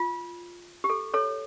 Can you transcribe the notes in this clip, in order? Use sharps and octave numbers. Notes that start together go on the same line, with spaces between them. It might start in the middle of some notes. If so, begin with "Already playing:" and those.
Already playing: F4
G4
A4
A4 C#5